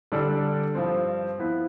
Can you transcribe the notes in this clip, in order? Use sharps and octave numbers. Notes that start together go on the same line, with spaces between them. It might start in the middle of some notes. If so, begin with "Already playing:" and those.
D3 G3 D4 A4 D5
G2 F3 C4
F3 B3 E4 B4